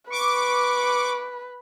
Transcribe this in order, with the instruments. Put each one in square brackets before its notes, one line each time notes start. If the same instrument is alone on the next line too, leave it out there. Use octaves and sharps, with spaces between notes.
[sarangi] B4 [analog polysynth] C#6 D6